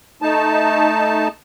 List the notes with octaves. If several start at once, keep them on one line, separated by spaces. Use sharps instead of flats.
A3 D#4 A5